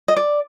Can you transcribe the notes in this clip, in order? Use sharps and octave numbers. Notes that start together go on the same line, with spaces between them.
D#5
D5